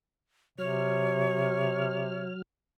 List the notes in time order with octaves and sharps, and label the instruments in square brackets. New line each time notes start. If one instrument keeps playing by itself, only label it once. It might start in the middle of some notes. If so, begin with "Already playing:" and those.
[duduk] C3 [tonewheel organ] F#3 F6 [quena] C#5